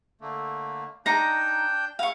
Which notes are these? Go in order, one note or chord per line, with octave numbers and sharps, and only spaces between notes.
D3 A3 A#3
D4 D#4 G5 A#5 G6
E4 F5 C#6